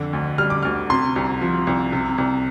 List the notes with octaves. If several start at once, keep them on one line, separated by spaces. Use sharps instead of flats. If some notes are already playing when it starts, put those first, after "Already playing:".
Already playing: F2 D3
D2
G3 F6
D6
D2 F6
C3 C6
C2
F3
C2
C3
C2